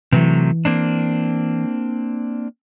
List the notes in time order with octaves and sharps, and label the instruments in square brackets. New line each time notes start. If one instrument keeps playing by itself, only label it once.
[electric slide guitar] C3 F#3 A3 [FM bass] E3
[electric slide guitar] A#3 C4 D4